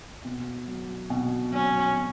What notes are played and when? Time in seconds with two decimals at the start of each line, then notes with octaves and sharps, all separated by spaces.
0.25 B2
0.67 F#3
1.10 B2
1.53 F#3 C#4
1.96 B2